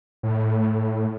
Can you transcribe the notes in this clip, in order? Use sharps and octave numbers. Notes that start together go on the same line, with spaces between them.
A2